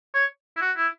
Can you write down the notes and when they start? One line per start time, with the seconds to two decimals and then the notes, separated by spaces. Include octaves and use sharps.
0.14 C#5
0.57 E4
0.61 F#4
0.77 E4